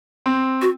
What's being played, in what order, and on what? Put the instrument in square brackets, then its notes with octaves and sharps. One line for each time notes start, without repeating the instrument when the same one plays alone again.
[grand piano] C4
[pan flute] F#4